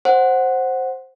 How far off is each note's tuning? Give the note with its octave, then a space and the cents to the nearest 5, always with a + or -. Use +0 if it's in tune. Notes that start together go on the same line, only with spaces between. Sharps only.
C5 +10 F#5 +0